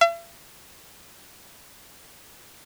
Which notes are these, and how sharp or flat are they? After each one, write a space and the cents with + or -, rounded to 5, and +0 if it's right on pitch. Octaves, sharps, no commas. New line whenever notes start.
E5 +45